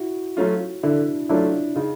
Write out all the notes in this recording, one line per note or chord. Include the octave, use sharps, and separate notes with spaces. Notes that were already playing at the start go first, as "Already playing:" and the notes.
Already playing: E4 F#4
F#3 A3 C#4 F4
D3 D4 E4
F#3 A3 C#4 D4 E4 F4
C#3 D#4 F4